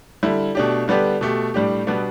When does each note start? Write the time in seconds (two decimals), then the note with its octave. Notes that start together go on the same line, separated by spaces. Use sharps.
0.23 D3 G3 E4
0.55 B2 A3 D4 G4
0.88 D3 G3 B3 D4 G4
1.21 B2 A3 G4
1.54 A2 G3 D4 G4
1.87 B2 G3 B3 D4